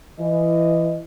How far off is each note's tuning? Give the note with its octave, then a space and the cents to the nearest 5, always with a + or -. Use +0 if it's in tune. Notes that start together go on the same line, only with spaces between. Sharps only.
E3 +20 D#5 -10